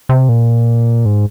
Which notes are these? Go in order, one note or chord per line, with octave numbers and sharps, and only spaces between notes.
C3
A#2
G#2